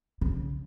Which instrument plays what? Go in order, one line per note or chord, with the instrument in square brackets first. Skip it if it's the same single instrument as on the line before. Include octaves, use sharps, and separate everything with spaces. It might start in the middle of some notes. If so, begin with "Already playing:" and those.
[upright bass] C#3